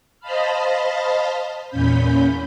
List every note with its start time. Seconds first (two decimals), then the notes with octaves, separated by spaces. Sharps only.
0.20 C5 D#5 F5 A5 B5 F6
1.69 E2 A#2 C#4 B5 G6